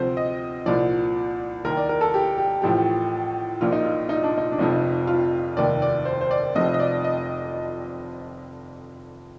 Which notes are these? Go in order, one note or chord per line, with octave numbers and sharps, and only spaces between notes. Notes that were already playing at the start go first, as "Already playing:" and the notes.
Already playing: D2 C3 F3 C5
D#5
C2 A#2 F3 D5
D#2 D#3 A#4
D5
A#4
A4
G4
G4
A1 A2 F3 G4
A#1 A#2 F3 F4
D#4
F4
D#4
D4
D#4
D4
F1 F2 C3 F3 D#4
F4
F1 D#2 D#3 D5
D5
C5
C5
D5
F1 F2 C3 F3 D#5
D#5
D5
D#5